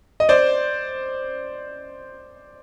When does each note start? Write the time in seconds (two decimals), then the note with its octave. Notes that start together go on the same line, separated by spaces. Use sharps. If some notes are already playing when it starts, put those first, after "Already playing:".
0.20 D#5
0.29 C5 D5